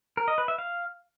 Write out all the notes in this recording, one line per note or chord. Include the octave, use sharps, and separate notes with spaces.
A#4
D#5
B4
E5
F5